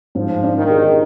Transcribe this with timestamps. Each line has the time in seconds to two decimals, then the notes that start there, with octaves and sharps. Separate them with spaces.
0.15 G#2 F3
0.43 D4
0.57 D#3
0.70 G#4